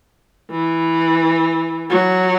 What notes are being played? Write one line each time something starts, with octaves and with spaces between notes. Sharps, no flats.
E3
F#3